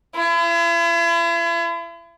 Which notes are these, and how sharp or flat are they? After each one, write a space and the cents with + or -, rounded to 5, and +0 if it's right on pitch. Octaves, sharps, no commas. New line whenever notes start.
E4 +40